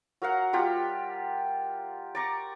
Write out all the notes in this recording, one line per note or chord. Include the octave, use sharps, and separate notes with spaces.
F#3 A#4 F5 F#5
G3 F4 G4 F#5
D5 A#5 C#6